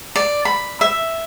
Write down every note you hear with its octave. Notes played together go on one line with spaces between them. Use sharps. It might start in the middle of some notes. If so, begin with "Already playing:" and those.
D5
B5
E5